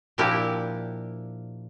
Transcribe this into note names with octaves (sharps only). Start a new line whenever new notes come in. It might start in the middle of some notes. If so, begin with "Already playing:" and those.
A#2 F3 D4 E4 G4 A#4